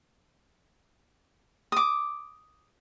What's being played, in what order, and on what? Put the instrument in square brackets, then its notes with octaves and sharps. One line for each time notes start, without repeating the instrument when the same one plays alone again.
[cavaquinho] D6 D#6